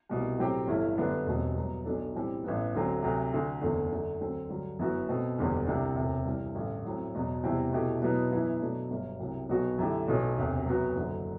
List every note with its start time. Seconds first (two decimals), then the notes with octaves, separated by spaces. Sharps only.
0.09 C2 B2 G3
0.38 A2 F#3 C4 G4
0.67 G1 G2 E3 A3 E4
0.98 F#2 D3 G3 B3 D4
1.26 E1 E2 B2 G3 C4
1.57 G2 F#3 B3
1.85 B1 B2 A3 D4 A4
2.14 A2 E3 G3 C4
2.44 A1 G2 E3 B3
2.74 D2 D3 F#3 C4
3.03 D2 C3 F#3
3.32 D2 D3 A3
3.62 F#1 E2 D3 A3
3.90 F#2 D3 A3 D4
4.20 D2 D3 F#3 C4
4.49 G2 D3 F#3
4.79 G1 F#2 E3 B3 F#4
5.09 B2 A3 C4
5.38 F#1 E2 D3 G3
5.67 C2 C3 G3 D4
5.96 E1 D2 C3
6.25 G2 E3 G3
6.55 A1 G2 D3 A3
6.85 A2 F#3 C4
7.14 E2 B2 F#3
7.43 E2 C3 G3 C4 E4
7.73 B2 A3 E4 G4
8.02 B2 F#3 B3 E4
8.31 F#2 E3 B3 E4
8.61 B2 F#3 A3 D4
8.90 G1 G2 F#3
9.19 C2 C3 F#3
9.49 B1 B2 F#3 B3 F#4
9.79 F#2 D3 A3 E4 G4
10.07 B1 B2 A3
10.38 E1 D2 C3
10.66 F#2 F#3 B3 F#4
10.95 F#1 F#2 D3 F#3